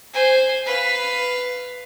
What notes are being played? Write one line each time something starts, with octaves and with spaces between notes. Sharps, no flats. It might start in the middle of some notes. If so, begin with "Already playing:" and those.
C5 G#5
B4 F5